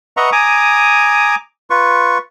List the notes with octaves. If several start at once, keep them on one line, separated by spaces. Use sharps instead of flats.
B4 D#5 E5 F#5 A#5 C#6
G#5 A#5 D6 D#6
F4 B4 C#6